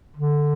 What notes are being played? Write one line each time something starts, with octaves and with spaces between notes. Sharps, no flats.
D3